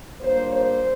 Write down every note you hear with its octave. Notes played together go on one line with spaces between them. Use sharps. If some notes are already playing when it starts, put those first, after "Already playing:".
A#2 G3 A#3 D4 C5
C5